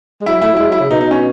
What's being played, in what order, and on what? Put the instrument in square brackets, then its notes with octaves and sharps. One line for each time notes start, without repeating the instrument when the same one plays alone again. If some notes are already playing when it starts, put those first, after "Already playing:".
[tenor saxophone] G#3
[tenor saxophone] F#3 [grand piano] E4
[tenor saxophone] A3 [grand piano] E4
[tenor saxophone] F#3
[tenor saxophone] G#3 [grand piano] E4
[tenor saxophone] F#3
[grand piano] E4
[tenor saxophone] C#3
[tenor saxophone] B2 [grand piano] D#4
[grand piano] D#4
C#4